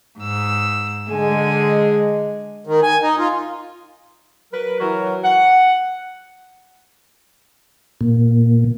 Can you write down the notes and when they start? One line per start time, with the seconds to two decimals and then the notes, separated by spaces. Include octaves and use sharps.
0.18 G#2 E6
1.09 D3 G#3 G#5
2.67 D#3
2.83 G#5
3.02 D#4
3.19 F4
4.53 F#3 A#4 B4
4.80 E3 F#3 A#4 C#5
5.25 F#5
8.01 A#2